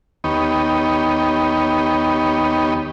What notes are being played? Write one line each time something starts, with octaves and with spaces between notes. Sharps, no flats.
D#2 B3 D#4 G4 C#5